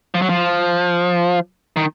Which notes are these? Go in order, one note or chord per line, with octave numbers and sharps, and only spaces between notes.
F3
F#3
F3
D#3